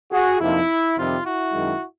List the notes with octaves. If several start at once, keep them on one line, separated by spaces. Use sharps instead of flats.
F#4 G#4
F2 C3 F3 A#3 D#4 E4
F2 C3 D#3 G3 F4
E4 F#4
F#2 D#3 G#3